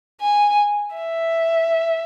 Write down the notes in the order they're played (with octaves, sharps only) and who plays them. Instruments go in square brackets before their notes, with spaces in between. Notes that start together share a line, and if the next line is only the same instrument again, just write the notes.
[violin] G#5
E5